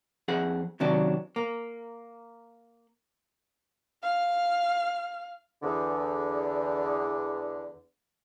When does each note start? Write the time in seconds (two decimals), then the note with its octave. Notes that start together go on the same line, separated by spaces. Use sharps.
0.28 F2 G#4 F#5
0.80 F#2 C3 D#3 F#3 D4
1.36 A#3
4.03 F5 F6
5.63 E2 D3